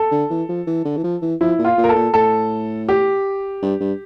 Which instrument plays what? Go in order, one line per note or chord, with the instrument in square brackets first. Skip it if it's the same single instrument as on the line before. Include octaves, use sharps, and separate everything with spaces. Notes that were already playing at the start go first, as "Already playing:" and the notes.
Already playing: [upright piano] A4
[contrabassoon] D3
E3
F3
E3
D3
E3
F3
E3
[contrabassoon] F3 [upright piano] E4
[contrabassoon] A#2
[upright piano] F4
[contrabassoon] A#2
[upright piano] A#4
A4
[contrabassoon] A#2
[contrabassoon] A2 [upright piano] A4
[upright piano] G4
[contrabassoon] G2
G2